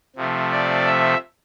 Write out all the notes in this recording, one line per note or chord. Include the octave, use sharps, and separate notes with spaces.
C3 F3 A3
D5
E5